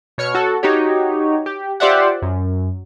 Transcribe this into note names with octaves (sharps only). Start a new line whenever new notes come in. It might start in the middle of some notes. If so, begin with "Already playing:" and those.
B2 C#5 F6 C#7
F#4 A4
D#4 F#4 G4 C#5
G4
F4 G4 C5 D5 E5 F#5
F#2